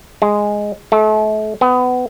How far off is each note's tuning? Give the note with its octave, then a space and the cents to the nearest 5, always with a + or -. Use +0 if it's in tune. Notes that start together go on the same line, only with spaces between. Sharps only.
G#3 -5
A3 -40
B3 +25